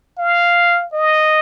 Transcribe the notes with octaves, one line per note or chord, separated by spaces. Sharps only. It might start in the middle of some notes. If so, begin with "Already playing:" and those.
F5
D#5